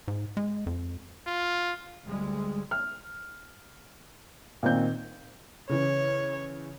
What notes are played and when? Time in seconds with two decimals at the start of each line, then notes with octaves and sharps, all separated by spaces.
0.08 G#2
0.37 G#3
0.66 F2
1.27 F4
2.06 D2 G3 G#3
2.71 F6
4.63 A#2 D#3 C4 G6
5.69 C#3 E3 C#5